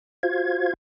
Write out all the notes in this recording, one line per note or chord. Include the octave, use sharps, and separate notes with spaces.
F4 F#4 C5 F5 G#6